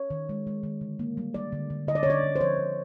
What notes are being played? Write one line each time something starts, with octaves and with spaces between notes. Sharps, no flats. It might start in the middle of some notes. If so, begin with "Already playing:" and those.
Already playing: C#5
D#3
G#3
G#3
D#3
D3
A#3
G3
G3 D5
D3
D3
D3 D#5
D5
C#5
D3 D5
D3
C5
F3 C#5
D3